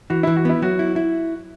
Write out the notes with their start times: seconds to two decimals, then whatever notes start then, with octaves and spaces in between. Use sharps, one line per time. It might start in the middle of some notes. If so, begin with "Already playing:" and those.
0.10 E3 F#4
0.23 E3 E4
0.36 F#4
0.45 B3 E4
0.62 F#3 F#4
0.79 E4
0.96 E4